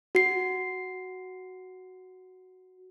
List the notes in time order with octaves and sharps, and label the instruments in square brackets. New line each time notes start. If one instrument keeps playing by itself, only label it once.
[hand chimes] F#4 C7